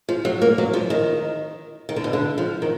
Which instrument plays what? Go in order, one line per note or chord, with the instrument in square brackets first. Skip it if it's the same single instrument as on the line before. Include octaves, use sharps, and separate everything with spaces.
[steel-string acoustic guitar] F3
F#3
A#3
F#3
F3
D#3
D#3
D3
B2
D3
F3
D#3